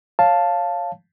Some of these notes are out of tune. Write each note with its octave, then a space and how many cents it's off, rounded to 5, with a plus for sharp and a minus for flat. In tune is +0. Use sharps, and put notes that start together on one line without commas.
C#5 +0 F5 +0 A5 +0